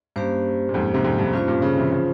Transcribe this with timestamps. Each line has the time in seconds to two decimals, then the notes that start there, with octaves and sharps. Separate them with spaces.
0.16 G2 A#3 C#4 G4 C5
0.69 A#2
0.74 F2 G#2
0.94 G#2 C3
1.04 F2 G#2
1.19 G2
1.27 G#2
1.33 G2 C#4 F4 C5
1.48 G2 A#2
1.62 A#2 C#3
1.77 C3 E3
1.92 C#3 F3